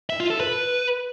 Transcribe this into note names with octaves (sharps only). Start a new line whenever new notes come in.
E5
F4
A4
B4